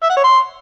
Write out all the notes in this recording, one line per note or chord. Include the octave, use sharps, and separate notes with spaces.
E5
F#5
C#5
C6